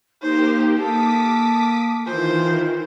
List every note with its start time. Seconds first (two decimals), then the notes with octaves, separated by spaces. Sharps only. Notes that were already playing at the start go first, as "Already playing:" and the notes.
0.22 A#3 D#4 G4 C5
0.78 A#3 A4 D6 D#6 B6
2.06 D#3 E3 F4 C5